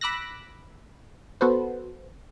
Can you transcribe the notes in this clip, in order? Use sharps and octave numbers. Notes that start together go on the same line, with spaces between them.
B5 D6 E6 F#6 A#6
B3 F#4 A4 B4 C5